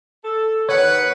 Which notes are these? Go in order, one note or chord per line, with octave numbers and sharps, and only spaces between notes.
A4
D#2 D3 D#3 B4 C#5 F#5